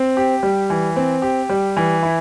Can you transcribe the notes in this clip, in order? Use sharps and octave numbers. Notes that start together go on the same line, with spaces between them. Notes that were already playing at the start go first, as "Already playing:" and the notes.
Already playing: C4
G4
G3
E3
C4
G4
G3
E3
E4